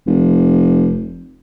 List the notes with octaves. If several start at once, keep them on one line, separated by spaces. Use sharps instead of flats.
F1